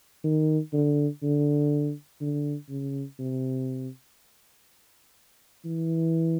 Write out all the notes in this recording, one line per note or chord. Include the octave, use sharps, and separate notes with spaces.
D#3
D3
D3
D3
C#3
C3
E3